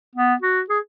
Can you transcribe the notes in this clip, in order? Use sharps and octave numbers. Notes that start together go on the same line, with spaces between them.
B3
F#4
G#4